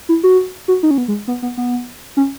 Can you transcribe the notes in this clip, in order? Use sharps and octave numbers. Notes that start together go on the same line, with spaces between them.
E4
F#4
F#4
D#4
C#4
B3
G#3
B3
B3
B3
C#4